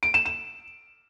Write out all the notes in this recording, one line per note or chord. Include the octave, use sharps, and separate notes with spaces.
D7
E7
E7